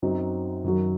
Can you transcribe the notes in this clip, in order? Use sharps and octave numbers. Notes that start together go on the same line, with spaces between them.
F#2 F#3 C4 D#4
F#2 D#3 F#3